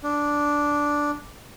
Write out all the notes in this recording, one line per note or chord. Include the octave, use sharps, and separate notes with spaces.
D4